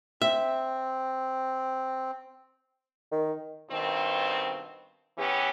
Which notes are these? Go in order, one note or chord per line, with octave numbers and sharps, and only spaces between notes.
C4 E5
D#3
G2 B2 D#3 C4
E3 B3 C#4 G4